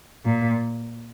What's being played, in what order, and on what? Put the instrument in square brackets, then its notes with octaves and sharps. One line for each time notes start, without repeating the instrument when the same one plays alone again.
[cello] A#2